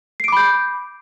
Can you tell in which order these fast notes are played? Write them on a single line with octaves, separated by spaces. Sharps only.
C7 D7 D6 B5 G6